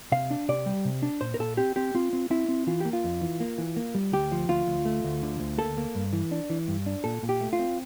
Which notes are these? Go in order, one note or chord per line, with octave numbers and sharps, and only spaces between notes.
C3 F5
D4
C3 D5
G3
C3
D4
A#2 C5
A#4
A#2 A4
C4 G4
C4 G4
C4 F4
C4
C4 E4
C4
E3 F4
A#3 G4
F4
F2
E3
A#3
E3
A#3
G3
D2 G4
F3
D2 F4
D2
A3
D2
D3
D2
A#3 A4
A#3
G2
E3
D4
E3
G2
D4
A#2 A4
A#2
G4
A3
F4
C4